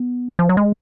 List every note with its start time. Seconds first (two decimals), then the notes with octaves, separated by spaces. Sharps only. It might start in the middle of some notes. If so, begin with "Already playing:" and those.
Already playing: B3
0.39 F3
0.49 F#3
0.57 G#3